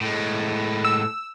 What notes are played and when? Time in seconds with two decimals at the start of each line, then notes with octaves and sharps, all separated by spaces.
0.01 A2 G#3
0.85 E6